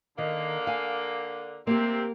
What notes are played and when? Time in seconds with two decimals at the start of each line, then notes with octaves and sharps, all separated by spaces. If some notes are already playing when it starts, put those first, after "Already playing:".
0.18 D3 D#3 A#3
0.67 F5 G#5
1.67 C3 A#3 C4 G4